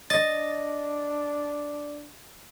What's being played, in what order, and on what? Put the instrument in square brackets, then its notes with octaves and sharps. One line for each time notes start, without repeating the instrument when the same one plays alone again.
[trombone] D4 [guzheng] D#5 [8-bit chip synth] A6